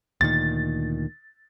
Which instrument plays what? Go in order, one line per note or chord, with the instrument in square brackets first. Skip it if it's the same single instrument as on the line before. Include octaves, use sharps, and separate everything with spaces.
[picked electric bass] D2 A#2 D#3 [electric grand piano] A6